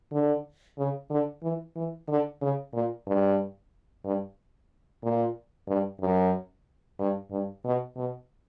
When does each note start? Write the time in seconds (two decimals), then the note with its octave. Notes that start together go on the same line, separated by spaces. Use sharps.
0.12 D3
0.78 C#3
1.10 D3
1.43 E3
1.76 E3
2.08 D3
2.42 C#3
2.74 A#2
3.07 G2
4.05 G2
5.03 A#2
5.68 G2
6.01 F#2
6.99 G2
7.31 G2
7.65 B2
7.97 B2